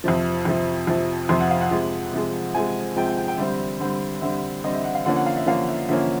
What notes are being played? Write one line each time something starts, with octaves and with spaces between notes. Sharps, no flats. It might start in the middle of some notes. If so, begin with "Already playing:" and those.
F2 C3 F3
F2 C3 F3
F2 C3 F3
F2 C3 F3 C6
F#5
F5
F#5
C3 F3 G#3
C3 F3 G#3
C3 F3 G#3 G#5
C3 F3 G#3 G5
G5
G5
G5
D3 G3 C4 E5
D3 G3 C4
D3 G3 C4 E5
D3 G3 C4 D#5
E5
F#5
F5
D3 F3 A#3 C#4 F#5
F#5
F5
E5
D3 F3 A#3 C#4 F5
E5
D3 F3 A#3 C#4 E5